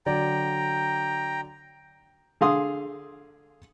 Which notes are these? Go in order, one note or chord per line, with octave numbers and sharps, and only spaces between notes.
D3 F#3 D5 G5 A#5
D3 G#4 F5 C6 D#6